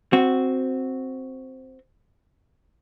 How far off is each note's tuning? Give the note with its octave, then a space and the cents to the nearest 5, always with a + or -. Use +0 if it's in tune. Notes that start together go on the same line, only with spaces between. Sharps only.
C4 +0 F#4 +0